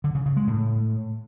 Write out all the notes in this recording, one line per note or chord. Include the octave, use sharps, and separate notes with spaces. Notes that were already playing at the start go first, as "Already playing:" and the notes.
D3
C#3
C#3
G#3
A2